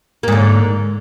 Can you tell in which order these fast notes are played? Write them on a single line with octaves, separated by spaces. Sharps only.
A#3 G#2 D3